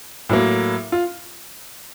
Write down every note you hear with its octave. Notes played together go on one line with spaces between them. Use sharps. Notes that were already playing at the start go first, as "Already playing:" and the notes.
A2 F#3 A#3
F4